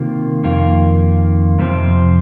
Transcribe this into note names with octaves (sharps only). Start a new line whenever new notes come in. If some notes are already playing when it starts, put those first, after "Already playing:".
Already playing: C3 D#3 A#3 F4
F2 D#3 A#3 F4
F2 C3 F3 C4